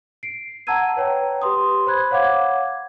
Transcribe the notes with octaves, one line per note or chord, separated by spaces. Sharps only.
C7 D7
F#5 A5 A#5 E6 G#6 D#7
B4 C#5 G5 A#5
G4 B4 C6 D#6
C5 B5 F#6 G#6
C#5 F5 F#5 D6 G#6